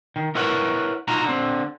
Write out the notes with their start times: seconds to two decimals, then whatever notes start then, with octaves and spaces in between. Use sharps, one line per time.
0.16 D#3
0.35 E4 A#4 B4 C#5 F#5
1.08 D#4 F4 F#4 F#5 A#5
1.24 D3 C4